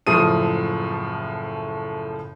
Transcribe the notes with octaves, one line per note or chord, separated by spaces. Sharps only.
F#1 A2 F3 D#6 D#7